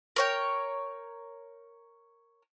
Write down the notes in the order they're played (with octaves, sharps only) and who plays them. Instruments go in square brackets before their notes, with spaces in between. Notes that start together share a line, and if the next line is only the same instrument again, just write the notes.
[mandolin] A#4 C#5 G5